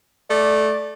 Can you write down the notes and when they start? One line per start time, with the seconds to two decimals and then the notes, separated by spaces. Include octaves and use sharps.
0.30 A3 D5